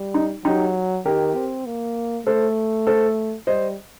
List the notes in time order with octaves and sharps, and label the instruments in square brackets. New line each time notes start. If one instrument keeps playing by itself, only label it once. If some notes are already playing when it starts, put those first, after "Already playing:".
Already playing: [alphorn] G3
[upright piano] D#4
[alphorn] F#3 [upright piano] D#4 G4
[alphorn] D#3 [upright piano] G4 A#4
[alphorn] C4
A#3
[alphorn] A3 [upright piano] A4 C5
[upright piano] A4 C5
[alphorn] G3 [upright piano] C5 D#5